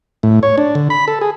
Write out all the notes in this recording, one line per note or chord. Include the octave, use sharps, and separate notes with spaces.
A2
C#5
D4
D3
B5
A4
G#4